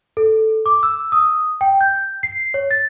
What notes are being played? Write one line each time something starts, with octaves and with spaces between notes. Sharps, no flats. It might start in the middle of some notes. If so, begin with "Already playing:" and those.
A4
D6
E6
D#6
G5
G6
C7
C#5
A6